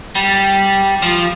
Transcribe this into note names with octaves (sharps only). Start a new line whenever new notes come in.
G3
F3